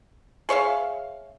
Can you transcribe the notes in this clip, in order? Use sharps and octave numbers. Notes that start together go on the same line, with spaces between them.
G#4 C#5 E5 F5